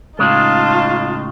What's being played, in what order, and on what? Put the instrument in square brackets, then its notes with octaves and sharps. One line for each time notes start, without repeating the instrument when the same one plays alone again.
[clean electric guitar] A2 C#3 G#3 [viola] D#4 F4 [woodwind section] C#5 F5 A5